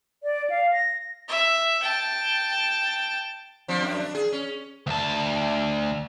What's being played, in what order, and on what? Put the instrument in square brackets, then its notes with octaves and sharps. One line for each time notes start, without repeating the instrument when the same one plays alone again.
[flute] D5
F5
A#6
[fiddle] E5
G5 A5
[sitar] F3 C4 D4
F#2 D4
D4
G#4
C#4
[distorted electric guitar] D2 A5